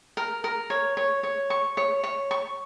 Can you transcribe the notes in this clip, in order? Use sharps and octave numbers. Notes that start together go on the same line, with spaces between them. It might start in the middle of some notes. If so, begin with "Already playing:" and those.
A#4
A#4
C#5
C#5
C#5
C#6
C#5
C#5
C#6